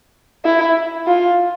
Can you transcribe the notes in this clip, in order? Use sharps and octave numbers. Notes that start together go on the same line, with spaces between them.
E4
F4